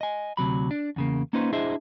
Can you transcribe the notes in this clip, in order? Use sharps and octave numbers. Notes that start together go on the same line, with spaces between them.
D#5 G#5
D2 C3 F#3 B5
D4
E2 C#3 A#3
A#3 C#4 D#4 F4 B4 C5
D4 E4 G#4 C5 D#5 E5